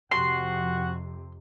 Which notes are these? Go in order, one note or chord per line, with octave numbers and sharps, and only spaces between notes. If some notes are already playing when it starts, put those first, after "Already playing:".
F2 C3 F#4 G4 F#5 C6